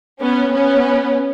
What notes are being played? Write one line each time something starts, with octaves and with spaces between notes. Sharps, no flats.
B3 C#4
B3 C#4